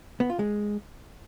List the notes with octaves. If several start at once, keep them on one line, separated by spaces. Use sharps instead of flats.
B3
F4
G#3